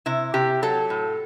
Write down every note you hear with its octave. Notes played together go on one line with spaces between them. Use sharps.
C3 E4
C3 G4
F#3 A4
A2